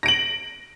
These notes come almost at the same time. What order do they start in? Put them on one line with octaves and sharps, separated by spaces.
A#6 D7 F#7